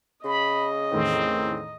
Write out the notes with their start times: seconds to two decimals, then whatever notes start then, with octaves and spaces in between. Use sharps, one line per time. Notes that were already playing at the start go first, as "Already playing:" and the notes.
0.24 C#3 D#5 B5
0.92 E2 A2 D#3 C4